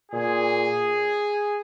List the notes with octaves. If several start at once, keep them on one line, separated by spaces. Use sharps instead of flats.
A#2 G#4